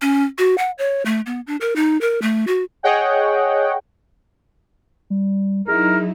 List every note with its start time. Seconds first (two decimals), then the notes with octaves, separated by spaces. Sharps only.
0.02 C#4
0.38 F#4
0.58 F#5
0.78 C#5
1.06 A3
1.26 B3
1.47 D4
1.61 A#4
1.76 D#4
2.01 A#4
2.22 A3
2.47 F#4
2.83 G#4 C#5 D#5 F#5 G5
5.10 G3
5.68 F#3 D#4 E4 G#4 A#4